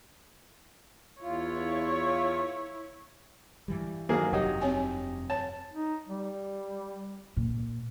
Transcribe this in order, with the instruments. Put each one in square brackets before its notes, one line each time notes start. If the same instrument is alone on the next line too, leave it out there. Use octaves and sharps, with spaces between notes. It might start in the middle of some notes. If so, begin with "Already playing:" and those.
[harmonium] E2 F4 [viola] E4 C#5
[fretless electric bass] G2 E3 G3
[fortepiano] G#1 A#3 G#4 [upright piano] F#3
[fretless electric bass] F1 G2 C3 [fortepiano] F#3 D#4 [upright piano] G4
[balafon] C4 C#5 G#5
[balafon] C#5 [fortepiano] A5
[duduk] D#4
G3
[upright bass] A#2